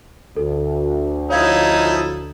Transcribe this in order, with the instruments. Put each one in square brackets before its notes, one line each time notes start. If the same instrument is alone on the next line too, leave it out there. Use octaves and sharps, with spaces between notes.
[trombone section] D2 [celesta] A4
[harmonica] F3 E4 [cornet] D#4 [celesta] C#5 F5 G#6